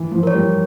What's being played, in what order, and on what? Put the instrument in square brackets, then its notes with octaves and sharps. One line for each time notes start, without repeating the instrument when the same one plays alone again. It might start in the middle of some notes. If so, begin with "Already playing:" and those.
Already playing: [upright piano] E3
F3
[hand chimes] A#4 C#5
[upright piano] G3